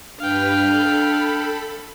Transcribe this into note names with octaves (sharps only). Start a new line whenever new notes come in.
G2 D4 B4 F5 G5 F6
A4 B5